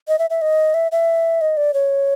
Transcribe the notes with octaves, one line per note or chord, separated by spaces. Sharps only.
D#5
E5
E5
D#5
E5
E5
D#5
D5
C#5